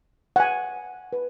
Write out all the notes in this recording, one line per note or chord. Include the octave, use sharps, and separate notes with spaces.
F#5
G#5
B4